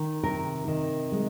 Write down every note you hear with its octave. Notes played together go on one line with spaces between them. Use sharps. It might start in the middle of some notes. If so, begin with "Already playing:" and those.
Already playing: D#3
C3 A#4
D#3
G#3